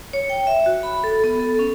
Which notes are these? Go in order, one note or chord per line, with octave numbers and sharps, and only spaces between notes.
C#5
G5
E5
F#4
B5
A4
B3
A4
C#4